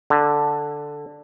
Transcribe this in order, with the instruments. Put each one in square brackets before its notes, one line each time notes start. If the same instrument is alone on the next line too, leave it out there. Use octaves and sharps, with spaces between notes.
[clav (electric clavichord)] D3